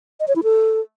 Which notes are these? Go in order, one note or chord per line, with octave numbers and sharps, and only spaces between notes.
D#5
C#5
E4
A4